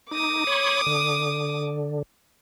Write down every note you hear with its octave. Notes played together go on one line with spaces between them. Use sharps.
D#4 D6 D#6
C#5 B5 C#6
D3